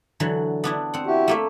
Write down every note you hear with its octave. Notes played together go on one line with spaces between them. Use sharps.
D3 E3 F#3
B3 D4 E4
C4 F#5
E4 F#4 G4
A3 A#3 E5